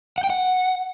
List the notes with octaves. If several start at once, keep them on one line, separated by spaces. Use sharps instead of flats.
F#5
G5
F#5